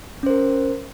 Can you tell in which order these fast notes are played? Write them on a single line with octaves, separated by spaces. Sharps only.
C#4 C5 A#4